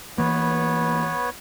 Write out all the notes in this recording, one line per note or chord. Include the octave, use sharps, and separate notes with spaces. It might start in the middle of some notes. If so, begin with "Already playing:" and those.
E3 A#3 B3 B4 C#5